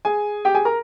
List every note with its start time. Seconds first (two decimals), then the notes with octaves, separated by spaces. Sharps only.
0.05 G#4 G#5
0.45 G4 G5
0.55 G#4 G#5
0.65 A#4 A#5